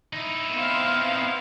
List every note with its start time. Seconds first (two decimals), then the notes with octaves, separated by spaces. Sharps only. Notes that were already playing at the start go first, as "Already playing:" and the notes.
0.13 D#4 E4
0.53 B3 C4 F5